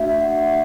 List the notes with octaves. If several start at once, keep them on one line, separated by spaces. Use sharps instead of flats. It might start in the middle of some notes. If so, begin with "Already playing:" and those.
Already playing: A3 D4 F#4 E5
E5
A3 D4 F#4 F#5